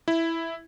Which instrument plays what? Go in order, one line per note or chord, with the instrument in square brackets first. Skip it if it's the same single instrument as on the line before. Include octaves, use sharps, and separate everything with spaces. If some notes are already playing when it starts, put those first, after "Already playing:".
[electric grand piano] E4